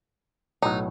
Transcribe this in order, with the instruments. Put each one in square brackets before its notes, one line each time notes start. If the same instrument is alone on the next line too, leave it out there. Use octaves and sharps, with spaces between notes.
[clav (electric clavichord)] B1 A2 F#3 [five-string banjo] D#4